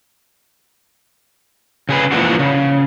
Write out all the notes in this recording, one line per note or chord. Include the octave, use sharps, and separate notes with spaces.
C#3 G#4 B4
E3 F3 A#3 D4 F#4
C#3